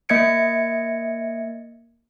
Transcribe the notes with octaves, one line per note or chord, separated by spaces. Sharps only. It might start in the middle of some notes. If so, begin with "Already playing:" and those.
A#3 D#5 E5 G#6 C#7 D7